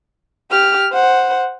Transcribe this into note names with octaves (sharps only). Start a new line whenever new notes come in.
G4 F6
C5 F#5